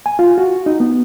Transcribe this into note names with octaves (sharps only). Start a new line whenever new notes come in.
G#5
F4
F#4
D#4
B3